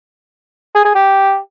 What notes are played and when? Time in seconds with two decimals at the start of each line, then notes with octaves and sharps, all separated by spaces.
0.75 G#4
0.85 G#4
0.95 G4